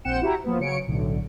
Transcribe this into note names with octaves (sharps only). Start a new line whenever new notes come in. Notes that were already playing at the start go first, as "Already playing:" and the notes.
A#1 C4 F#5 G5 C#7 E7
E4 F#4 G4 E5 A#5
F3 A#3 B3
C#3 F#3 C#5 C#7 D7
B1 A2 D3